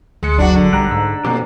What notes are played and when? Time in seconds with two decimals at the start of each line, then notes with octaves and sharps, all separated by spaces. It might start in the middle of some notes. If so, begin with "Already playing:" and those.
0.23 D2 G#3 C#7
0.38 F#1 F#3 D4 E4 F#4
0.55 D3
0.73 B1 G3 A#5 F#6
0.91 G#2 E6
1.25 F2 B2 A#3 G4